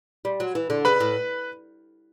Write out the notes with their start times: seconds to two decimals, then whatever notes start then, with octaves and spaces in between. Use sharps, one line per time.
0.25 G3
0.40 F#3
0.55 E3
0.70 D3
0.85 C#3 B4 B5
1.00 A2